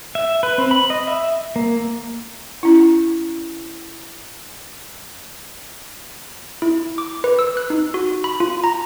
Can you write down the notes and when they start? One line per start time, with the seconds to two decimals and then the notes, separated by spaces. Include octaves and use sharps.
0.15 E5
0.43 B4
0.58 C4
0.71 B5
0.90 D#5
1.07 E5
1.56 A#3
2.63 C#4 E4
6.62 E4
6.98 D6
7.24 B4
7.39 E6
7.57 F#6
7.70 D#4
7.94 F#4
8.24 B5
8.40 F4
8.64 A#5